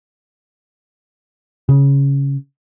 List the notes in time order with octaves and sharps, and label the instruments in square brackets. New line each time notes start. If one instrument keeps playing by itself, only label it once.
[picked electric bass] C#3